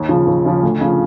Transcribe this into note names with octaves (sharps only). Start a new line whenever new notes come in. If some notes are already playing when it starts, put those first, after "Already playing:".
Already playing: D#2
C#3 F3
D#2
C#3 F3
D2
C#3 F3